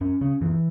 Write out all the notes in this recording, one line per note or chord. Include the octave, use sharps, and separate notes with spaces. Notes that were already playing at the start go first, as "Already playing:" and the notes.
F#2 C#4
C#3 C#4
F#2 E3